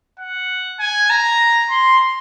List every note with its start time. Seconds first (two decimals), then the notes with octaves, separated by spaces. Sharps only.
0.19 F#5
0.79 G#5
1.10 A#5
1.70 C6